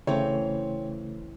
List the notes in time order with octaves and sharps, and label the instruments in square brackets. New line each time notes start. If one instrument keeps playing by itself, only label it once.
[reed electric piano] C#3 A3 [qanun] E3 C4 [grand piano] C#5 G5